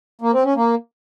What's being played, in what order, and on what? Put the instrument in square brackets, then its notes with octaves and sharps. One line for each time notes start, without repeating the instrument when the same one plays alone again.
[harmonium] A#3
C4
C#4
A#3